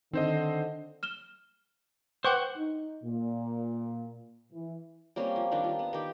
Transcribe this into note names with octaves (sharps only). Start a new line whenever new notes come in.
D3 D#3 C4 C5 D#5
F6 E7 G7
B4 C5 F#5 G5 C#6 D6
D#4
A#2
E3
G3 A#3 C4 C#4
F3
D#3 G3 D4
F4
B3
D#3 G4